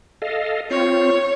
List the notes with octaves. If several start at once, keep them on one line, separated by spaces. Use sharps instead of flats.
A4 D#5 F5
C4 F4 C#5